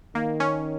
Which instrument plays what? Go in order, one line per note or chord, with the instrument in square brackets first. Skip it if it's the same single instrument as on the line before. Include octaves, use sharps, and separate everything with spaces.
[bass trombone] D#3 [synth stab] A#3
[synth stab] C#4